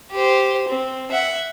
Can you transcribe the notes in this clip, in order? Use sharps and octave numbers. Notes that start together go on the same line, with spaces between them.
G4 C5
C4
E5 F#5